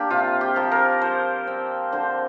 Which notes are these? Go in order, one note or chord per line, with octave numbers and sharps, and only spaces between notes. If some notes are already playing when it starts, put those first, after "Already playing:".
Already playing: A#3 D4 G4
C3 F4
G4
F3 A#3
A#4
F3 C5
C4
D3 C5